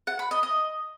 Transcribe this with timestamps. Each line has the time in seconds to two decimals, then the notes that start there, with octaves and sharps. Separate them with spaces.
0.07 F#5
0.19 B5
0.31 D#5
0.43 D#5